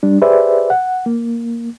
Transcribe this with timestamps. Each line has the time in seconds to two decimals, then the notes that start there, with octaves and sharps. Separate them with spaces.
0.03 G3 D4
0.22 G4 G#4 B4 C5 D5 E5
0.70 F#5
1.06 A#3